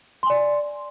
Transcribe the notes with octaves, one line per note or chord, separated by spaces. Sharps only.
D5 G#5 C6